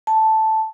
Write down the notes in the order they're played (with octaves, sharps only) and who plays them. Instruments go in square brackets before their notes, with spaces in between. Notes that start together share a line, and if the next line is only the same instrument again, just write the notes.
[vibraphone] A5